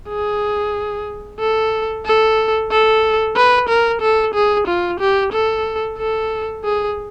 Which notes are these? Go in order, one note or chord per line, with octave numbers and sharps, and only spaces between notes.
G#4
A4
A4
A4
B4
A#4
A4
G#4
F4
G4
A4
A4
G#4